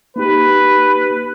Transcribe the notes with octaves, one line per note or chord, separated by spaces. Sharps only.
A#3 D#4 G4 B4